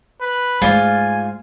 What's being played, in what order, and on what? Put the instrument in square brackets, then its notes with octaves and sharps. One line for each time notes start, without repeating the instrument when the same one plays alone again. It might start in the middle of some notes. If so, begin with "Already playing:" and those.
[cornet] B4
[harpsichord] G#2 D5 [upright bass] A3 [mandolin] F4 [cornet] G#5